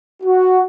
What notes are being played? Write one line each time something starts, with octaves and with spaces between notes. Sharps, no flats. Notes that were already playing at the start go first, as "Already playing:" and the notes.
F#4